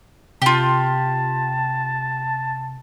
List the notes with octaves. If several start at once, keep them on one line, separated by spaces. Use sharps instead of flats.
C3 F4 G4 A5